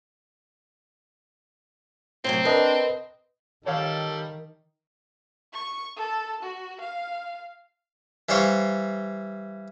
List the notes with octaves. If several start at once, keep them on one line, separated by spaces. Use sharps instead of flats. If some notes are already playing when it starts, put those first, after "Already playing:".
A2 C3 F#3 C4
D4 A#4 B4 D#5
D#3 G3 A4 C#5 F5
C#6
A4
F#4
F5
E3 G3 C5 C#5 F5